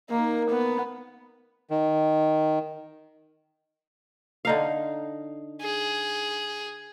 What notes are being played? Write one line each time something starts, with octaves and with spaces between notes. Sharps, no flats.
D#3 A#3
B3
D#3
D3 D#4 F5
G#4